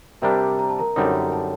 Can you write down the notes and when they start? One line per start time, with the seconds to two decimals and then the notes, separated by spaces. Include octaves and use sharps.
0.22 C3 G3 D4 G4 A#4 A#5
0.59 A#5
0.69 A5
0.79 A#4 A#5
0.96 F#2 D3 G3 C4 D#4
1.32 A4 A5